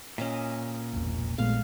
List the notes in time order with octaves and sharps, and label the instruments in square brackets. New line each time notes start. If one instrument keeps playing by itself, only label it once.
[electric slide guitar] A#2 [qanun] C#4 D#5 E5
[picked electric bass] E1 A#1
[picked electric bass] A#1 B3 [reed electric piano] A#2 G#3 A3 [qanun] F5